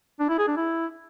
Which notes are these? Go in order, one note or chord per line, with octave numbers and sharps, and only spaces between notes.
D4
E4
G#4
D4
E4